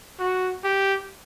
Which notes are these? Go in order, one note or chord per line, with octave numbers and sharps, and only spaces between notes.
F#4
G4